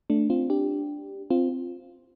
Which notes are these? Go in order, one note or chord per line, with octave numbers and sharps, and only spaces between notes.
A3 D4
C4 F4
D4 G4
C4 F4